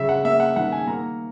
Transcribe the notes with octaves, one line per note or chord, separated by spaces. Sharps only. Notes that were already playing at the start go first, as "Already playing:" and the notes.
Already playing: C#3 F#3 E5
F#5
A#3 E5
F#5
D#3 F#5
G#5
A#3 A#5